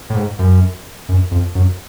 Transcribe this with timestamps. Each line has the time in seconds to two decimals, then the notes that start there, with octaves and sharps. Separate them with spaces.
0.10 A2
0.16 G#2
0.39 F#2
1.09 F#2
1.31 F2
1.55 F#2